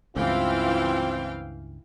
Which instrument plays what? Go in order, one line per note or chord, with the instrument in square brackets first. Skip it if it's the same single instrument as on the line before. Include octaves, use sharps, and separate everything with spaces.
[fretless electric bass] C#2 G2 [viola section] E3 F5 G5 [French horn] C4 [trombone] F4